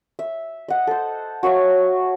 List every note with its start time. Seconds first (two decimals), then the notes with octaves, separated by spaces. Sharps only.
0.19 E5
0.68 D#5 F#5
0.87 A4 C5
1.43 F#4 C#5 E5 F5